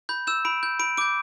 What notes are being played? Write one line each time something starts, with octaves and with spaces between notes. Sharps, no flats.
B5 G6
E6 G6 E7
B5 D7
G6
B5 D7
D6 G6 D7